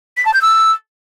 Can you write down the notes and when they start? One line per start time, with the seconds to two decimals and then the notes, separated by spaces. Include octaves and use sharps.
0.17 B6
0.25 A5
0.33 G6
0.41 E6